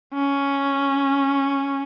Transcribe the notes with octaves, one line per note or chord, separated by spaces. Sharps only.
C#4